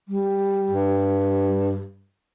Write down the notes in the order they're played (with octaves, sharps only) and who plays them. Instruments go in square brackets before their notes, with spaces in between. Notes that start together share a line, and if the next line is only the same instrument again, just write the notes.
[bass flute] G3
[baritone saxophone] G2